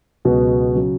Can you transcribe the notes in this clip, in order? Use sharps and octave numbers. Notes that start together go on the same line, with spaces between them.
C#2 B2 F#3 B3 F#4
C#3 F#3